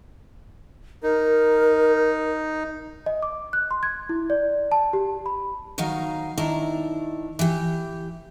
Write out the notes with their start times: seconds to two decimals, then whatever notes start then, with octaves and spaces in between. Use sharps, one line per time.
1.03 D#4 A#4
3.06 D#5
3.22 D6
3.53 F#6
3.71 C6
3.83 G#6
4.09 E4
4.30 D5
4.72 A5
4.93 G4
5.26 B5
5.78 D#3 F#3 D#4 F5
6.37 D#3 D4 E4 A#5
7.39 E3 G4